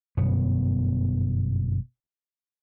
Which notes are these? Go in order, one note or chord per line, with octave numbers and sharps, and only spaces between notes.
G1 F#2 B2 B3